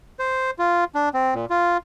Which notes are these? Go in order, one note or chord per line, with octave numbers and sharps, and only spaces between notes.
C5
F4
D4
C4
A#2
F4